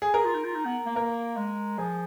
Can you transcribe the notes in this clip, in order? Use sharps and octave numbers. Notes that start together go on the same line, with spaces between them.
G#4
G#4 A#4
F4
D#4
F4
D#4
B3
A#3
A#3 A#4
G#3
F3 G#4